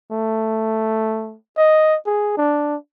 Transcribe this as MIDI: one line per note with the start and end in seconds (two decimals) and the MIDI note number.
0.12 1.36 57
1.57 1.97 75
2.06 2.32 68
2.37 2.75 62